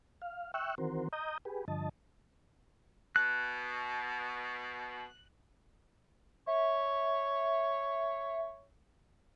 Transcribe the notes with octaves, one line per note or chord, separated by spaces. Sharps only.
F5
E5 G5 C#6 E6 F#6
D#3 E3 C4 F#4 A#4 C5
D#5 A#5 D#6 G6
G4 G#4 B4
G2 D3 F3 D#5 A5
B2 F#6
C#5 E5